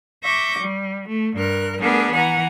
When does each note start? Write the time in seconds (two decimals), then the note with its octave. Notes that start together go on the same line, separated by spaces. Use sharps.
0.23 E5 C#6 D6 G6 A#6
0.59 G3
1.07 A3
1.36 G2 A#4 F#6
1.79 A3 B3 D4 G#4 A#4
2.12 E3 F#5 G#5 A#5